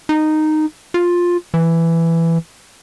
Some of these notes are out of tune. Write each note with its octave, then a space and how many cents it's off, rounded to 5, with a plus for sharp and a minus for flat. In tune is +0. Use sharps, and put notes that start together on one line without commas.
D#4 -10
F4 +10
E3 +10